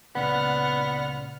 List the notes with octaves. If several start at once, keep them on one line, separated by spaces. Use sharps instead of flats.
C#2 A#2 C#3 B3 D5 F#5 F6